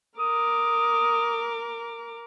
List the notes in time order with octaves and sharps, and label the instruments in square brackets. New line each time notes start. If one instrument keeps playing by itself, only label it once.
[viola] A#4 D6 [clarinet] D#6